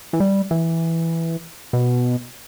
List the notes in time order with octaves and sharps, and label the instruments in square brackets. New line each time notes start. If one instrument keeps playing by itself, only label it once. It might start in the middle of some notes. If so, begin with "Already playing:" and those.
[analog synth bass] E3
G3
E3
B2